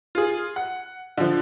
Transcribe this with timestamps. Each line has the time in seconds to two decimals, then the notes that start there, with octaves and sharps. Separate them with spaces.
0.15 F4 G#4
0.56 F#5
1.18 D3 F3